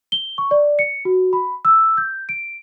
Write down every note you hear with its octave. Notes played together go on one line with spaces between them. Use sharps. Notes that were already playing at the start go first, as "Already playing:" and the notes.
G7
C#6
D5
C#7
F#4
B5
E6
G6
D7